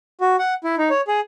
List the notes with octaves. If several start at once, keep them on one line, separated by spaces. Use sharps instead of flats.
F#4
F#5
E4
D#4
C#5
G#4